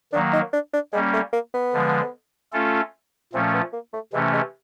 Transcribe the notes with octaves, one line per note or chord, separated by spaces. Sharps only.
D#3 F#3 A#3 D4
D#4
D4
D4
G3 G#3 A#3 C#4
A3
A#3
B3
D3 F3 G#3
A3 C#4 F4 A4
A#2 F3 A3 C4 C#4
B3
A#3
A3
C3 E3 G#3 A3 C#4
G#3